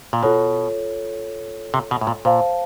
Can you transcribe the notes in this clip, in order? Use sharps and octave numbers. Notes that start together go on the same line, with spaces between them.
A#2
B2 F4 A4 C#5
C3
B2
A2
A#2
A#2 C5 F5 A5